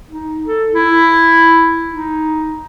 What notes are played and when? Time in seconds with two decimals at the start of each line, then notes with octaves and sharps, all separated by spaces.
0.09 D#4
0.46 A4
0.74 E4
1.89 D#4